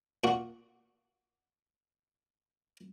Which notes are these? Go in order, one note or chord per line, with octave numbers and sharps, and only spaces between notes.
A#2 F#4